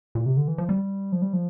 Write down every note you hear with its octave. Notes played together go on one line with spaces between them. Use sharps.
A#2
C3
D3
E3
F3
G3
F3
G3
F3